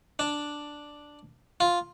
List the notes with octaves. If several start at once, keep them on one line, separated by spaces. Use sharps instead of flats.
D4
F4